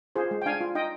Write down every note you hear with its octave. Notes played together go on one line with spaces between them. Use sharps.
F4 G#4 C5
G#3
G5
D4 F5 G#5
F4
D#4 D#5 G5